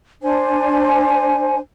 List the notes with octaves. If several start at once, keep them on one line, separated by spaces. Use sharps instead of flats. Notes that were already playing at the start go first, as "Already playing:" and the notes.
D4 C5 G#5